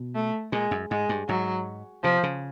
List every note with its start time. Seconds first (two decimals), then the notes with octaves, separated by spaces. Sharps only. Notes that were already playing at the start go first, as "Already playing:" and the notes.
Already playing: B2
0.15 A3
0.52 A#2 G#3
0.71 F#2
0.91 G#2 G#3
1.09 G2
1.28 G#2 F#3
2.04 C3 F3
2.23 C#3